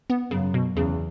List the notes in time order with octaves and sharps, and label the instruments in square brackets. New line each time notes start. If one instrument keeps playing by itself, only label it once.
[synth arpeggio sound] B3
[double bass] F#2 [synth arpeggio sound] C#3
[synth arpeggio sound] B2
[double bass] E2 [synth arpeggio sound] C#3